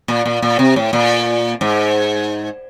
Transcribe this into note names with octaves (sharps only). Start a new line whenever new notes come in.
A#2
A#2
A#2
C3
A2
A#2
G#2